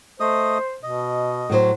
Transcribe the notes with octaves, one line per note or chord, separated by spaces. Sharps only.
A3 C5 D#5 D#6
B2 D#5
A2 F#3 C5